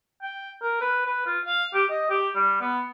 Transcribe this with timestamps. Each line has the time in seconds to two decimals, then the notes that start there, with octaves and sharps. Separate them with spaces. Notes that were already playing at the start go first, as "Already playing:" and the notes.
0.22 G5
0.62 A#4
0.81 B4
1.06 B4
1.26 F4
1.45 F5
1.74 G4
1.90 D#5
2.10 G4
2.35 G3
2.61 B3